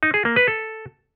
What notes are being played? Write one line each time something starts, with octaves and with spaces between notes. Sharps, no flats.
D#4
G#4
A#3
B4
A4